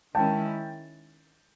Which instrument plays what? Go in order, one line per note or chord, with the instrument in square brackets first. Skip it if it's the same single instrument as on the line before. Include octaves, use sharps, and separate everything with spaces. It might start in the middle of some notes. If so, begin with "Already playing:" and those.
[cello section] D#3 G#3 C#4 E4 [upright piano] G5 A5